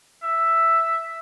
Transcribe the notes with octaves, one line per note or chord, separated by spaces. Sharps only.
E5